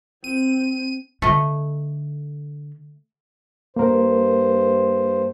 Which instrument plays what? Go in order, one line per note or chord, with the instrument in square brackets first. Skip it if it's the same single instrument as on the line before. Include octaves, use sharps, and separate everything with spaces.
[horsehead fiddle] C4 [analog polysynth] D#7
[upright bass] D3 [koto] A3 D#5
[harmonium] G2 C5 [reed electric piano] A#3 A#4